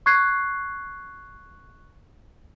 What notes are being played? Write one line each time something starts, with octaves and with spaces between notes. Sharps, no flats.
C#6 F#6 G#6 C7